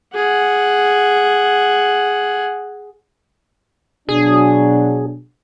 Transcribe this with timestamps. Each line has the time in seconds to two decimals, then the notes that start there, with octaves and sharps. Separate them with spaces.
0.15 G#4 F#5
4.09 B2 F#3 D4 G#4